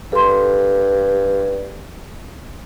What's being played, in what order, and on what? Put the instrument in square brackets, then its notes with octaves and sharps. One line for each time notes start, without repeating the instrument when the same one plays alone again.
[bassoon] G2 [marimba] A4 C6